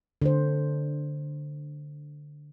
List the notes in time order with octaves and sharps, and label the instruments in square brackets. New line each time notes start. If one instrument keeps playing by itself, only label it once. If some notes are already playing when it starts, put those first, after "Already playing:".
[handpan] D3 C5